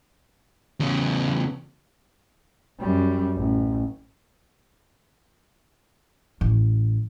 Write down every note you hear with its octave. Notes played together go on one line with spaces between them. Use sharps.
E2 C#3
F#2 G3
A1
A1